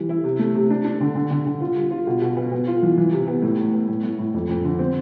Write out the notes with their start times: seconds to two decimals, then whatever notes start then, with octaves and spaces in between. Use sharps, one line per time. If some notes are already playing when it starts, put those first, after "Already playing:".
Already playing: E3 G3
0.09 E4
0.24 C3
0.39 A3
0.55 C3
0.70 D4
0.84 D4
1.00 D3
1.15 D3
1.31 D3
1.46 D3
1.61 F4
1.76 G3
1.91 F4
2.07 B2
2.22 B2
2.37 B3
2.52 B3
2.67 F4
2.83 E3
2.98 E3
3.12 C3
3.28 B3
3.42 A2
3.59 A2
3.73 B3
3.88 A2
4.03 A2
4.19 A2
4.34 F2
4.49 F2
4.64 D3
4.79 C4